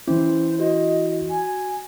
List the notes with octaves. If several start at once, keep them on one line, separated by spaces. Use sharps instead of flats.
E3 C#4 E4 C5
F#4 D#5
G#5